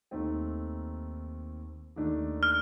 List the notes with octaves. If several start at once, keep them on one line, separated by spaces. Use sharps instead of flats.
D#2 D#3 A3 C4
D#2 D#3 A3 D4
F6